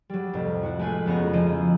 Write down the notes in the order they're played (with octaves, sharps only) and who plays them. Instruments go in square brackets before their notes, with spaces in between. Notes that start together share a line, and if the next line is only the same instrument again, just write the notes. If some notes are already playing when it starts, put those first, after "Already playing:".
[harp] F#3 G3
C2 F2 A2 C3
E4 F#4
G#3 A3 F4 G#4 B4 G#5
F2 C#3 B3 C#4 F#4 A#5
C#3 F3 E4 D#5